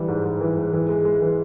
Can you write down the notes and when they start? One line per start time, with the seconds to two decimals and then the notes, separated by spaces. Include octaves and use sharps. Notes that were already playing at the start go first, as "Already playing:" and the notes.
Already playing: E3 G3
0.08 G#2
0.25 G#2
0.41 E3
0.57 G#2
0.73 E3
0.89 G#3
1.05 G#3
1.22 E3